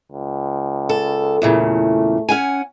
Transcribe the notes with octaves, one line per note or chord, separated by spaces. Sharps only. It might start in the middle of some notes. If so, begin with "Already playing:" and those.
C#2
A4
E2 A#2 C#3 A3
C#4 F#5 G#5